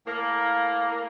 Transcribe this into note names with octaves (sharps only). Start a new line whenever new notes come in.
A2 A#3